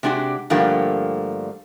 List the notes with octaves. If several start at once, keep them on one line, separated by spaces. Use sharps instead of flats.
C3 G#3 D4 F#4 G4
G2 D3 F3 A3 A#3 G4